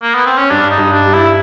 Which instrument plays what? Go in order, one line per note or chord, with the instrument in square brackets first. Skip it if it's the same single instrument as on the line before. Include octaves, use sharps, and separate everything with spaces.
[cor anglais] A#3
B3
C4
C#4
[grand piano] G2 [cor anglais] D4
[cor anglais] D#4
[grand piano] G2
[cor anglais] D4
[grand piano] G3
[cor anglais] E4